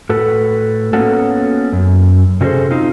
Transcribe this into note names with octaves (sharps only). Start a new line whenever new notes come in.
A2 F#4 A4 B4
A#3 B3 C#4 F#4 A4
F#2
C3 C#4 F#4 G#4 A4 C5
C4 D#4 F4